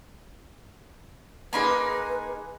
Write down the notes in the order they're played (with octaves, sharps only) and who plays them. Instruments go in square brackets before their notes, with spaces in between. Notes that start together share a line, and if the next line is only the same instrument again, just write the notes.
[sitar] A#3 D#4 G#4 [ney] B4 [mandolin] G#5 B5 C6